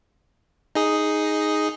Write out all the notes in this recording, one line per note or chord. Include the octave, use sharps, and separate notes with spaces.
D#4 G#4 D#5